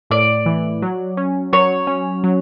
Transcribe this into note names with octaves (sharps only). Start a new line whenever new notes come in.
A2 D5
E3
F#3
C#4
F#3 C#5
C#4
F#3